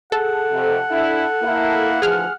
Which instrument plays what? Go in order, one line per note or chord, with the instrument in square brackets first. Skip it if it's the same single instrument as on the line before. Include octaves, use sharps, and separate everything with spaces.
[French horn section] G#4 [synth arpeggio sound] A4 [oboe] F#5
[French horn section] F2 C3
D4 E4
A#3 E4
[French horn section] D2 E3 F3 [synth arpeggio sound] G#4 F6